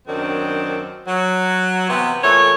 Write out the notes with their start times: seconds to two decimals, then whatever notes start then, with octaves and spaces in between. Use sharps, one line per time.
0.07 F#2 D#3 F#3 C4 D4
1.06 F#3
1.89 C3 E3 B3
2.22 A#2 E3 A3 C#5